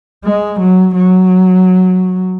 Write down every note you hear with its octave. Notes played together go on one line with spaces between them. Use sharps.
G#3
F#3
F#3